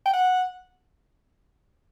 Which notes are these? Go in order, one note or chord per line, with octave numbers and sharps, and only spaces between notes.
G5
F#5